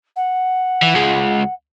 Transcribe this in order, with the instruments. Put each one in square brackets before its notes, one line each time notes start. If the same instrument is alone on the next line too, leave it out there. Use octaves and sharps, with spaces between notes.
[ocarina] F#5
[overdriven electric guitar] E3
C#2 G#3